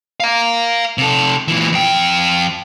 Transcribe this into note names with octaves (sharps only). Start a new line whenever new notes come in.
F5 A#5
C3 A4
A#2 E3
F2 G5